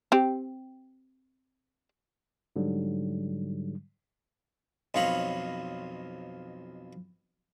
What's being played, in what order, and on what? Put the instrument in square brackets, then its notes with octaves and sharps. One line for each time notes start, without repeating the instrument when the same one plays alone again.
[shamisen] C4 G4
[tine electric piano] G#2 D3 F#3 G3
[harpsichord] B1 F2 D#4 F4 C#5 B5